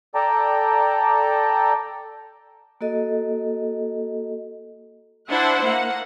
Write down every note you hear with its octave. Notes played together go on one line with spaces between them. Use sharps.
A4 D5 G5 A5 A#5
A#3 F#4 A4 D#5
D4 E4 C5 E5 F#5
A#3 F#5